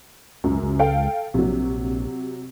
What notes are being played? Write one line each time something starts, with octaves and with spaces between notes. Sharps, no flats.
C#2 F#2
C#2
A4 F5 G5
A#1 C3 F#3